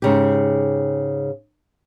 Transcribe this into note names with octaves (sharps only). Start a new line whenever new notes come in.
G#2 C#3 G4